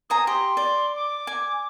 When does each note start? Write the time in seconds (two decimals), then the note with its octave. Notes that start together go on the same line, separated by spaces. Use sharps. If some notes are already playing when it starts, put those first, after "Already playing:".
0.10 C5 G#5 A#5 D#6
0.27 G4 C6
0.57 D5
0.95 D6
1.27 G#5